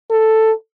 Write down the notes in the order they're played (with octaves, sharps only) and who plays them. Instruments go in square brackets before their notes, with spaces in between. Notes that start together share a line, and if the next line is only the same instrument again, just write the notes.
[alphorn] A4